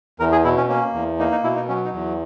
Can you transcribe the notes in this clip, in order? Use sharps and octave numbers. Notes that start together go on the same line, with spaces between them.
E2 A#4
G#4
B2 E4
C#4
A#3 C#4
E2
A#3 D#4
D#4
B2 E4
D#4
F#3 C#4
D#4
E2